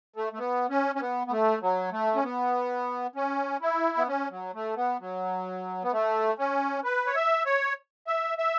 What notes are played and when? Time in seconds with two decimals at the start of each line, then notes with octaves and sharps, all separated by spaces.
0.16 A3
0.33 A3
0.39 B3
0.70 C#4
0.95 C#4
1.01 B3
1.27 B3
1.31 A3
1.62 F#3
1.92 A3
2.15 C#4
2.24 B3
3.16 C#4
3.62 E4
3.98 B3
4.08 C#4
4.31 F#3
4.54 A3
4.77 B3
5.00 F#3
5.83 B3
5.92 A3
6.39 C#4
6.84 B4
7.07 C#5
7.16 E5
7.46 C#5
8.07 E5
8.38 E5